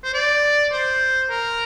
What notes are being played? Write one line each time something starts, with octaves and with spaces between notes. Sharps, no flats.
C5
D5
C5
A#4